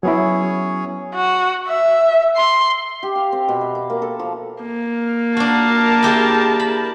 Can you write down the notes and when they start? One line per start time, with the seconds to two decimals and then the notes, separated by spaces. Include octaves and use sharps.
0.03 F#3 B3 C#4 E4 G#4 C#5
1.15 F#4
1.68 E5
2.36 C6
3.03 G4
3.16 F5
3.32 C4
3.48 B2
3.61 E5
3.75 D6
3.90 A#3
4.02 A4
4.19 F3
4.63 A#3
5.37 D4 F#4 A#4 A5
6.02 E4 G4 G#4
6.60 B5